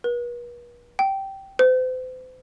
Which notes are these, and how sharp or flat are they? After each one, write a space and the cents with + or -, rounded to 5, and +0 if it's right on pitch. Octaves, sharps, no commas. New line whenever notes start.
B4 -45
G5 -15
C5 -40